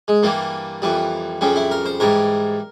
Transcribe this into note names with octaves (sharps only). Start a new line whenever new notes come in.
G#3
G2 E3 G3 A#3
F2 E3 G3
F2 C#3 G3 C#4
E4
A#4
C5
G#2 E3 G3 A#4